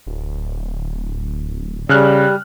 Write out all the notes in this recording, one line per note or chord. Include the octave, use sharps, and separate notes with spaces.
D1
C#3 G3 F6 F#6